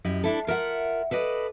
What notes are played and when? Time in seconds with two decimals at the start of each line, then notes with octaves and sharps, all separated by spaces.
0.04 F#2 E4 G4 D#5
0.24 D4 E4 A4
0.47 F4 A#4 E5 F#5
1.11 A4 B4 D5 D#5